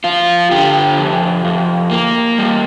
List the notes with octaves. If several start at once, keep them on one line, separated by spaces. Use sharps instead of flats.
F3 F4
D3 G4
F2
F2
A#3
G3